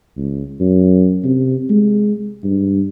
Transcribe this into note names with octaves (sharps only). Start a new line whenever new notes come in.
C#2
F#2
C3
G#3
G2